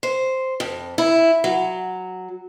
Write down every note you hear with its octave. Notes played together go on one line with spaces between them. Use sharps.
C5
F2
E4
F#3